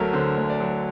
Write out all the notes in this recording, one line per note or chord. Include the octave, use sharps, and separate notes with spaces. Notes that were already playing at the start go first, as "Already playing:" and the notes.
Already playing: D2 F#3 A3 A#4
D3 C5
D2
D5
F#3